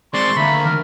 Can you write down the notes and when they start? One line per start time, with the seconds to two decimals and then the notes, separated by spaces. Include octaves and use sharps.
0.14 G#3 C4 D5 C6 C#6
0.36 D2 D3 A3 A#3 B5
0.65 D#3 A#4